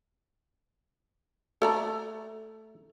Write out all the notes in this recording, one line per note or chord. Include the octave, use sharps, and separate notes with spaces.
A3 A4 D5 A#5